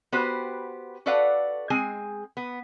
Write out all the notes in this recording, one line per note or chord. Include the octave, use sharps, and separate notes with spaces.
B3 F#4 G4 B4 C5
F#4 A4 B4 D5 F5 F#5
G#3 C4 G#4 G#5
B3